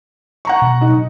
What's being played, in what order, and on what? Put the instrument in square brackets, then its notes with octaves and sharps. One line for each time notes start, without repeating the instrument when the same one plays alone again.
[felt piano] F#5 A#5 C#6
[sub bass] B2
[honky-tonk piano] D#4